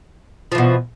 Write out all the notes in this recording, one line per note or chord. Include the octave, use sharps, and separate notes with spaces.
B2 E3 F3